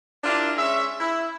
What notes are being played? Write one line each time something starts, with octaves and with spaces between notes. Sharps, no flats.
D4 E4 F4 G4 A#4
G#3 C#4 E5
E4